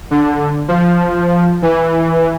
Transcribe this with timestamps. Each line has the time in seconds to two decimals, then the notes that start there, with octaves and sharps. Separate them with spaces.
0.11 D3
0.68 F3
1.62 E3